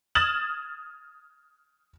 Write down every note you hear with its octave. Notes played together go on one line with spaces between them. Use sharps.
D#6 F6 G#6 A6 E7 F#7